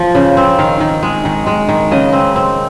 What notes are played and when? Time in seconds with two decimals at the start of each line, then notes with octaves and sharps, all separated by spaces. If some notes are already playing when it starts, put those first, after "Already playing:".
Already playing: F3
0.15 C#3
0.37 C4
0.58 D#3 F5
0.80 D#3
1.03 G#3
1.25 D#3
1.46 G#3
1.69 D#3
1.91 C#3 D#5
2.13 C4
2.36 C4